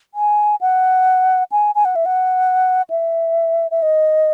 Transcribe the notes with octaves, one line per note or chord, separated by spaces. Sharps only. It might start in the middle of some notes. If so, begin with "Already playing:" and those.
G#5
F#5
G#5
G#5
F#5
E5
F#5
E5
E5
D#5